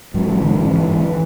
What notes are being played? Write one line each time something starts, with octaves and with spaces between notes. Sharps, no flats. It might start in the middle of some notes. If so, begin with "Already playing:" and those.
G#2 F#3
G#2 E3
G#2 D3
G#2 E3
G#2 E3
G#2 E3